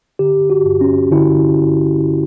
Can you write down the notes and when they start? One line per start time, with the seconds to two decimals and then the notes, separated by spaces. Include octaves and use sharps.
0.19 D3 G4
0.50 F#4
0.65 G2
0.81 C#4
1.12 D3 E4